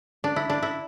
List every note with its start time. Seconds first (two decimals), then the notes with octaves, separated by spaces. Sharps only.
0.24 D4
0.36 E4
0.50 D4
0.62 E4